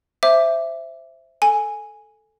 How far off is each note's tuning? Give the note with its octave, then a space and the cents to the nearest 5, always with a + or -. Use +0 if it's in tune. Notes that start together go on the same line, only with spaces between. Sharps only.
C5 +0 E5 +10 D6 +0
A4 +0 G#5 +0